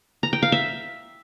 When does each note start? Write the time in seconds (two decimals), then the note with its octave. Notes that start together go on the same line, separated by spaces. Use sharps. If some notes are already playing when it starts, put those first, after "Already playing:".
0.23 A#5
0.33 G5
0.43 F5
0.52 E5